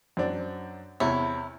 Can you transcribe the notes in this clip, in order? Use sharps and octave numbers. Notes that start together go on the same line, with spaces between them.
F#2 C4 D4
E2 C3 E4 C#5